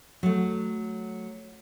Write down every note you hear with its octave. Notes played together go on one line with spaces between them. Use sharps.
F#3 A3